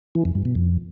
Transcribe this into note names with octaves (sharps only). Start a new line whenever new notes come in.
E3
F2
G2
B2
F2